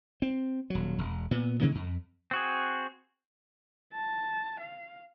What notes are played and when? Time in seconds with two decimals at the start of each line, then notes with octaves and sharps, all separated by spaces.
0.22 C4
0.70 D#1 F#3
0.98 E1
1.31 A#2 B3
1.61 C3 D#3 A#3 C#4
1.75 F2
2.31 C4 F#4 G#4
3.93 A5
4.60 F5